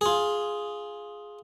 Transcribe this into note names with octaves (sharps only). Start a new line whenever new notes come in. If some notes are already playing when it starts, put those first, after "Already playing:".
F4 G#4